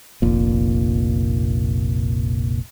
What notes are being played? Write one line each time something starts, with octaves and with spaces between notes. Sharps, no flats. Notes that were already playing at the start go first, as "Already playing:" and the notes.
F1 A#1 A#2